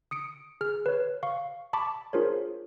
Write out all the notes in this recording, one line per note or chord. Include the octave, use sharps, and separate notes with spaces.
D#6 C#7 D7
G#4 F6
B4 C#5
F5 C#6
A5 B5 C#6 D6
D4 F4 G#4 A#4 C5 C#5